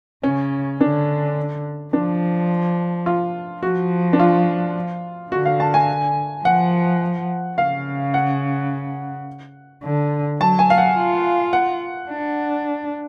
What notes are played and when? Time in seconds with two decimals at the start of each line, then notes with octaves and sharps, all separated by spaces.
0.24 C#3 C#4
0.81 D3 D4
1.93 F3 D4
3.06 F4
3.62 F3 F#4
4.13 D4
4.19 F4
5.32 D3 F#4
5.46 F5
5.60 A5
5.74 G#5
6.44 F3 F#5
7.57 C#3 F5
8.14 F#5
9.83 D3
10.40 F#3 A5
10.59 G#5
10.70 F5
10.78 F#5
10.97 F4
11.53 F#5
12.10 D4